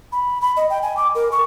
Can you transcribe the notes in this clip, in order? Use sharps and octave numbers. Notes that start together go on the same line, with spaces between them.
B5
B5
D#5
G5
G#5
D6
A#4
C#6